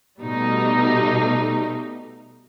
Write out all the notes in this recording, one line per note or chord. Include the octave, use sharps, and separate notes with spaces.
B2 G3 A3 D#4